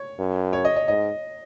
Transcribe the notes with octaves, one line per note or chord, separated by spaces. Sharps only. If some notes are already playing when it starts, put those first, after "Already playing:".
Already playing: C#5
F#2
C#5
D#5
D#5
G#2 D#5